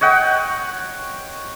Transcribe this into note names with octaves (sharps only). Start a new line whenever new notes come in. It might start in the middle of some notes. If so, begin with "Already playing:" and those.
C#5 D#5 F#5 G5